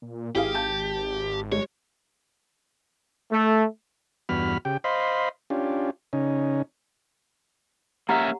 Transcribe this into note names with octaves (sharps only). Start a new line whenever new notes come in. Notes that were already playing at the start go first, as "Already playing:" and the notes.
A#2
G#1 E4 G4 G#4 F5
A5 G6
G3 G#3 C#5
A3
E2 G2 B3 F#4 B5 F6
C#3 G4 G5
C5 D#5 F5 B5 C6
C#4 D4 F4 G4
C#3 C#4 D#4
A#3 C#4 G4 E5 F#5 A#5